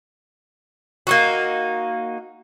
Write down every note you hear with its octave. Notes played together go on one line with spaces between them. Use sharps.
A#3 D#4 F#4